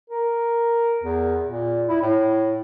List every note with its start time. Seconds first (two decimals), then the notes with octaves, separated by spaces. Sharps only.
0.10 A#4
1.04 E2
1.45 A#2
1.88 E4
2.02 A2